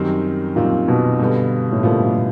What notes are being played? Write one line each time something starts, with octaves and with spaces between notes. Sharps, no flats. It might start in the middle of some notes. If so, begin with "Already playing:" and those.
Already playing: F#2 D#3 G3 C4
F#2 A#2 D#3 G3 C4
B2
G2 D3 G3 B3
A2
G2 A#2 D3 G3 B3
A#2
B2